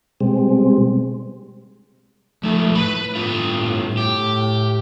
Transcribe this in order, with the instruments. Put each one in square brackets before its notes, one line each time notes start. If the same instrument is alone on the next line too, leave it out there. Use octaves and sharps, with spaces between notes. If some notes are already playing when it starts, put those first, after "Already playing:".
[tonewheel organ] B2 G3 G#3 C4
[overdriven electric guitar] F3 D#4 [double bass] A3
[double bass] A2 [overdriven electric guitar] B4 B5
[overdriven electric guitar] G2 F4
[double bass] A2
[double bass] A2 [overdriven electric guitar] G4